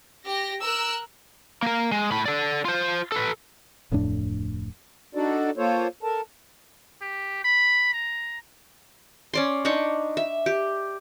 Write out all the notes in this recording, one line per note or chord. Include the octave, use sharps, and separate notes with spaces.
G4 A#6
A#4 E6 F#6
A#3 A#4
G#3
A2 B5
A4 D5
F4 C5
A4 B4
D1 F2 A2 D4
D4 D#4 F#4 A4 D5
A#3 F4 A4 C5 C#5
A4 A#4 A5
G4
B5
A#5
C#4 D5 C6
D4 D#4 B5 C#6
E5
G4